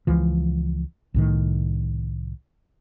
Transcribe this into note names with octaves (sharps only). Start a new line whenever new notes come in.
C#2 E3 F3
C2 A2 D#3